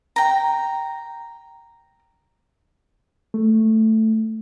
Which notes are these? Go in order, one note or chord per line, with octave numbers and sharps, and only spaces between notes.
G5 A#5
A3